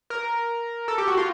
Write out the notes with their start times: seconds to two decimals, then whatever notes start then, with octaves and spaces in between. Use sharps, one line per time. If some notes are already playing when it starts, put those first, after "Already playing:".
0.10 A#4
0.88 A4
0.98 G4
1.07 F#4
1.17 F4